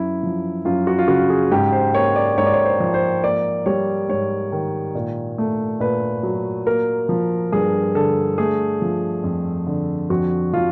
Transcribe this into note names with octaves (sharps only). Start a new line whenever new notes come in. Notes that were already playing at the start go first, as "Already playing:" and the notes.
Already playing: F#2 E4
F3
F#2 F4
F#4
F4
C#3 F#4
G#4
G#2 G4
C5
A#3 C#5
D5
G#2 C#5
D5
C#5
C5
F3
C5
A#3 D5
G3 C#5
G#2 C#5
D#3
A#2
A3
A#2 B4
F#3
A#3 A#4
F3
G2 G#4
D3 A4
A3 G#4
F3
F2
D3
F2 F#4
F3 F4